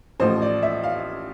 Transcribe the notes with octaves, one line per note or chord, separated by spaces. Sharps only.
A1 A2 F3 C5
D5
E5
F5